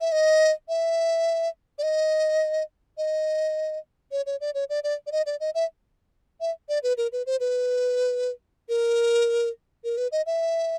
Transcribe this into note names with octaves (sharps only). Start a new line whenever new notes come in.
E5
D#5
E5
D5
D#5
D#5
C#5
C#5
D5
C#5
D5
D5
D5
D#5
D5
D#5
E5
E5
D5
B4
A#4
B4
C5
B4
A#4
A#4
B4
D#5
E5